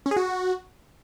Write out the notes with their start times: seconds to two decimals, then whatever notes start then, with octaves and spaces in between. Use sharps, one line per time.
0.06 C#4
0.11 G#4
0.17 F#4